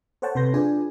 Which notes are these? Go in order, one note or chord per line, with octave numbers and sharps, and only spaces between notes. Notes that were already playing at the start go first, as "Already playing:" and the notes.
A4 C5 C#5 F#5 G5 A5
C3 A4 B4 C6 G6 A#6
D4 F4 G#4 B4 D5 G#5